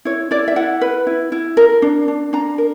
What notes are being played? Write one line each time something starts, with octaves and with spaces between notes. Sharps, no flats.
E4 C#5
E4 D5
E5
E4 F#5
B4
E4
E4
A#4
D4
D4
D4 A#5
A#4